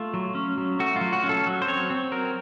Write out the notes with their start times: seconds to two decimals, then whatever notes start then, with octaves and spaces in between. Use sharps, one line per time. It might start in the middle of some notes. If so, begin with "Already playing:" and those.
Already playing: A3 F4
0.14 F#3
0.35 C#4
0.58 F#3
0.80 A3 F#4
0.96 F4
1.01 F#3
1.13 F#4
1.23 C#4
1.29 A4
1.47 F#3
1.62 C5
1.68 C4 C#5
1.90 C4
2.12 F#3 A#4